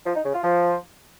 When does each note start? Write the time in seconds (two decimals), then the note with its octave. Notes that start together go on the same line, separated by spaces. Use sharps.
0.06 F3
0.15 D#4
0.24 C#3
0.34 F4
0.43 F3